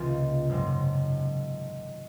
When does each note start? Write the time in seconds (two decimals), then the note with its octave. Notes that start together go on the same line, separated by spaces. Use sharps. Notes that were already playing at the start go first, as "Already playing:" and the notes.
Already playing: C#2 C3 D#3 A#3 F4
0.49 G#1 F#2 C#3 G#3 C4